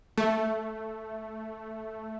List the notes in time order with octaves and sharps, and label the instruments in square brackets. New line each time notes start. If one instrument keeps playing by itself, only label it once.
[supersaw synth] A3